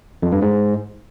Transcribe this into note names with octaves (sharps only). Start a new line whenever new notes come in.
F2
G2
G#2